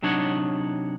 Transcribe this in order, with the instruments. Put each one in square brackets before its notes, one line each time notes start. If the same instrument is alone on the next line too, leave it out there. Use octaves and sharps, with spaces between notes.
[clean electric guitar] C3 F#3 D4 D#4 C#5 F#5